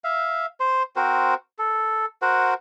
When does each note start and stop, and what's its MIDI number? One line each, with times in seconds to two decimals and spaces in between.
0.04 0.46 76
0.04 0.46 77
0.60 0.83 72
0.60 0.83 84
0.96 1.34 60
0.96 1.34 66
0.96 1.34 70
0.96 1.34 72
1.59 2.06 69
2.22 2.54 66
2.22 2.54 70
2.22 2.54 72
2.22 2.54 78